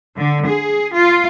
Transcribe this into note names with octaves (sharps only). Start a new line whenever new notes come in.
D3
G#4
F4